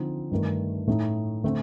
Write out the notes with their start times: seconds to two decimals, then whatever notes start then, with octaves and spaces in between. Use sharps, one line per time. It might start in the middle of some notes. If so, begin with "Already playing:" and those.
Already playing: D3 F3 C4 D#4
0.31 G2 D#3 A3 D4
0.87 A2 A3 D#4
1.44 D3 A3 C4